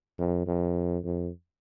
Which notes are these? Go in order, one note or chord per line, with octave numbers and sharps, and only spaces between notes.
F2
F2
F2